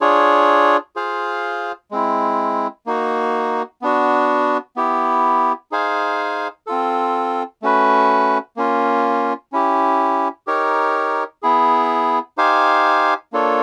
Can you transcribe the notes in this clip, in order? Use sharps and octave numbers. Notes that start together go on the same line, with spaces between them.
D4 F4 G#4 C#5
F4 G#4 C5 F5
G#3 C4 E4
A#3 D#4 F#4
B3 D4 F#4
B3 E4 G4
D#4 G#4 C5 F5 G#5
C4 F4 A4
A3 C#4 F#4 B4
A#3 C#4 F4
C#4 E4 G4
D#4 G4 A#4 C#5
B3 E4 G#4
D#4 G4 C5 F5 G#5
A#3 D4 F4 A4 C#5